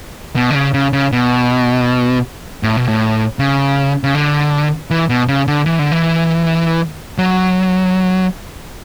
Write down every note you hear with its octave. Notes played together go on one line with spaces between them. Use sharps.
B2
D3
C#3
C#3
C#3
B2
A2
B2
A2
C#3
C#3
D3
E3
B2
C#3
D3
E3
D3
E3
F#3